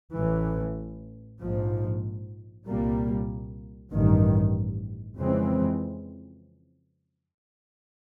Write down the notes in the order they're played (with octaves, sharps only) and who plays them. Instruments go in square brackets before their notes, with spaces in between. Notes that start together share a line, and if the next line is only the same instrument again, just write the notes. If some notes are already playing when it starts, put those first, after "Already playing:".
[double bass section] A1 A2 E3
A#1 G#2 F3
C2 A#2 G3 A#3
A1 G2 D#3
F2 C#3 E3 G#3 C4